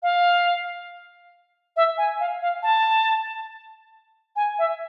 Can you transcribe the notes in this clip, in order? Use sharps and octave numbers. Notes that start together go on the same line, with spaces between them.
F5
E5
G#5
F5
F5
A5
G#5
E5